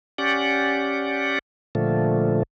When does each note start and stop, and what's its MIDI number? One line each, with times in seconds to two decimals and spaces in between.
0.18 1.39 61
0.18 1.39 67
0.18 1.39 74
0.18 1.39 78
1.75 2.43 46
1.75 2.43 50
1.75 2.43 53
1.75 2.43 57